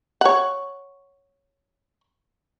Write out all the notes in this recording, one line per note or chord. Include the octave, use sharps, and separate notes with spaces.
C#5 F#5